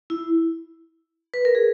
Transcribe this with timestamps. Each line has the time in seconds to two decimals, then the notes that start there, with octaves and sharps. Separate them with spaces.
0.10 E4
1.34 B4
1.45 A#4
1.55 G#4